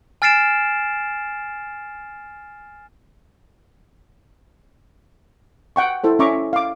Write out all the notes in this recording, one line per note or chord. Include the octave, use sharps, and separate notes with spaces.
G#5 F6 A6 C7 D7 E7
F#5 G5 C#6
E4 A4 C5
C#4 E5 A#5 C#6 D6
F5 D6